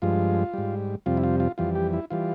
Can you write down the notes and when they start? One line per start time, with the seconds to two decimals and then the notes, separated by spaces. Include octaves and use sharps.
0.02 G2 F3 G#3 F4
0.54 G#2 G3
1.06 F2 C3 G3 F4
1.17 E4
1.24 F4
1.40 F4
1.58 F2 E3 G3 F4
1.75 G4
1.93 E4
2.10 E3 G3 F4